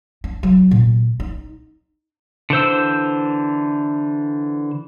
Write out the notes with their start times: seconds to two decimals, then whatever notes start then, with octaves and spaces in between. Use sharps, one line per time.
0.24 D4
0.43 F#3
0.71 A#2
1.20 D#4
2.50 D3 E3 C5 E6